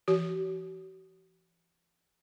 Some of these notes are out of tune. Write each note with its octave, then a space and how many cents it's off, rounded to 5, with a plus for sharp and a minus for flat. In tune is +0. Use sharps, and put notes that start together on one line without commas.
E3 +40 F#4 +45